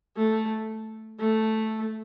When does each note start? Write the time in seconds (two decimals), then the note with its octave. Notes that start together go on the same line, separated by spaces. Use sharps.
0.17 A3
1.19 A3